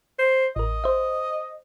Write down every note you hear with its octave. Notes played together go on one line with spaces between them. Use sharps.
C5
A1 A#4 D#5
C5 E5